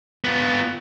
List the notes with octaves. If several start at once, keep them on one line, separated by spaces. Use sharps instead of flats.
B3 F4